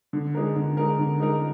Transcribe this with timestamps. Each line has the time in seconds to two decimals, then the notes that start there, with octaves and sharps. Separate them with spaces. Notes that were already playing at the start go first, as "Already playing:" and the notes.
0.13 D3
0.35 G#3 D#4 A#4
0.56 D3
0.77 G#3 D#4 A#4
0.99 D3
1.20 G#3 D#4 A#4